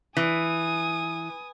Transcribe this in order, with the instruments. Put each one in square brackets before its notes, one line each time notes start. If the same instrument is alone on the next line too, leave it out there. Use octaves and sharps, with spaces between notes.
[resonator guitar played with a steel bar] E3 [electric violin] G#5 D#6